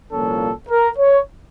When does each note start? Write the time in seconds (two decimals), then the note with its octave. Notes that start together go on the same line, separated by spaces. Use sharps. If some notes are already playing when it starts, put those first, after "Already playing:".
0.10 C2 A#2 F3 A#3 C#4 A4
0.69 A#4
0.98 C#5